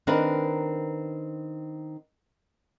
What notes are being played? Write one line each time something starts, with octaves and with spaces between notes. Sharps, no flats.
D#3 C4 D4 A#4 B4